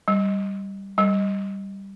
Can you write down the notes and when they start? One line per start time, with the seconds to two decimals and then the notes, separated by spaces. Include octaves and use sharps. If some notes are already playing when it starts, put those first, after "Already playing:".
0.08 G3
0.98 G3